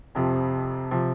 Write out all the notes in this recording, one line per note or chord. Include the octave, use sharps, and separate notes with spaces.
F2 C3 F3
C3 F3